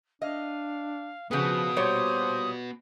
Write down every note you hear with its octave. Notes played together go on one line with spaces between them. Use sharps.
D4 D#5 F5
C#3 F3 B3 F#4 G#4 B4 D#6
A#2 G3 C5 C#5